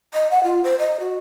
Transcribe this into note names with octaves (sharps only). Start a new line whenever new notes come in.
D#5
F#5
F4
C5
D#5
F#4